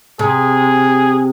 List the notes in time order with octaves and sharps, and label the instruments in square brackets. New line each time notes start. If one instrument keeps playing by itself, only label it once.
[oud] C3 [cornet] G#4